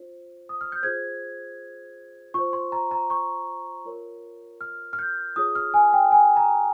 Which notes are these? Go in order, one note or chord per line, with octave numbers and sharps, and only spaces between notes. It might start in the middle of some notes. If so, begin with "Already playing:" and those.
Already playing: F4 C5
D#6
F6
G6
F4 G#4 C5 G#6
F4 C5 C#6
C6
A#5
A#5
C#6
F4 A#4 C#5
F6
F6
G6
F4 G#4 C#5 D#6
F6
G#5
G5
G#5
A#5